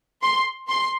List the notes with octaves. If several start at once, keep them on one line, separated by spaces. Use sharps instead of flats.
C6
C6